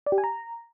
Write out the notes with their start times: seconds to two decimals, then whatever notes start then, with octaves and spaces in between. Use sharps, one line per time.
0.06 D5
0.12 G4
0.18 G#5
0.24 A#5